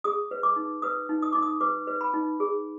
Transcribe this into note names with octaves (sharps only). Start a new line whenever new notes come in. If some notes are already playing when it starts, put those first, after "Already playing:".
G#4 D#6
B4
D6
D#4
B4 D#6
D#4
D#6
D#4 D6
D#6
B4 D6
B4
B5
D#4
G#4